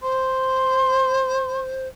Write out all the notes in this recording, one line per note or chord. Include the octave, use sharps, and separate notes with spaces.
C5 C6